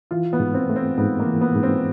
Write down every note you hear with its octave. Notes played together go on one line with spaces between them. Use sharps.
E3 F4
B3
G#2
C4
A3
C4
G#2 B3
A#3
E3
B3
G#2
C4